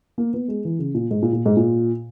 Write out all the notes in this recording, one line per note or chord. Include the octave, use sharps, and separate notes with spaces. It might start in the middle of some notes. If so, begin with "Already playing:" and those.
A#3
B3
G#3
E3
C#3
A#2
G#2
A#2
A#2
G#2
A#2